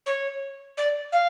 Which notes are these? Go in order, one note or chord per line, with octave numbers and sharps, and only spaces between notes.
C#5
D5
F5